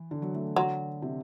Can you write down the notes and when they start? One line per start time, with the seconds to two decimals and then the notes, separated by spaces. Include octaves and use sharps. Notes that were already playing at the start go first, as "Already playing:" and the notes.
Already playing: E3
0.11 D3
0.22 F#3
0.34 A3
0.56 D3 F#3
1.02 C3